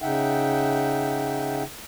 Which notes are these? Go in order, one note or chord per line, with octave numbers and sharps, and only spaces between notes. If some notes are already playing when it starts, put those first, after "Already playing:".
C#3 D#4 E5 F#5 G5